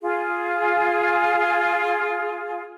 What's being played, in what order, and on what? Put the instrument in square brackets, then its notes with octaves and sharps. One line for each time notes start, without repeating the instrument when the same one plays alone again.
[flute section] F4 G#4